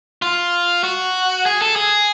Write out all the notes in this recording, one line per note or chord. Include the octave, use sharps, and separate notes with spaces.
F4
F#4
G#4
A4
G#4